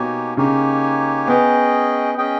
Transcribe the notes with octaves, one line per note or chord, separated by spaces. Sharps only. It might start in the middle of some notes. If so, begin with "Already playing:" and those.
Already playing: B2 A#3 D#4 G4 C#5 G#5
C#3 A#3 D#4 G4 C#5 G#5
B3 C#4 G#4 D#5 G5
C#4 G#4 D#5 G5